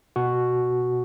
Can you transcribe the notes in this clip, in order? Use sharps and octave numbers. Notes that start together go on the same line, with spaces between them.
B2 F#4